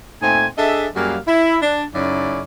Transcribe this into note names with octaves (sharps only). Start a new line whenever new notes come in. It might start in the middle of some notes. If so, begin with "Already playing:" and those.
A#2 A3 C4 D#4 G#5
D4 G#4 A4 D#5 E5
F#2 G3 A#3 F#4 G#4 F5
E4
D4
F#2 C#3 C#4 D#4 E4 D5